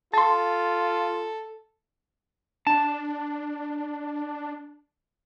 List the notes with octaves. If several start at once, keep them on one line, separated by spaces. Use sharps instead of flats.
F4 A4 A5 C6
D4 A5